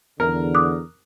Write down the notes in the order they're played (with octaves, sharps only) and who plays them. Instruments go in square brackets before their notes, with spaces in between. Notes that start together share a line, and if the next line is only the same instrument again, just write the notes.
[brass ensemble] E2 D3 [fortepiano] A#4
[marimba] D6 D#6 F#6